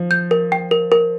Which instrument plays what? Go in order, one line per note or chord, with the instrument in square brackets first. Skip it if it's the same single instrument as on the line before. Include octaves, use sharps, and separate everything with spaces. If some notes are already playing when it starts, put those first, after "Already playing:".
Already playing: [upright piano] F3
[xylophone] G6
A#4
G5
A#4
A#4